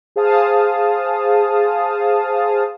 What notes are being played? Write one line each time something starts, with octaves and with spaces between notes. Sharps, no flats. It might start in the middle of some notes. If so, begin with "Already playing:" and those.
G#4 C5 F5 A5 D#6